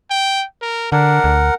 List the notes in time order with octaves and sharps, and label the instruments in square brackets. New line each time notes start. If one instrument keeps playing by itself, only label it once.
[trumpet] G5
A#4
[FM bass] D3 [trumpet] D4 [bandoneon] A#4 F#5
[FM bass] D2